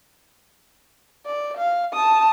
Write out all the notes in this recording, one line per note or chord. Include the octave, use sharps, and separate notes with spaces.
D5
F5
A5 D#6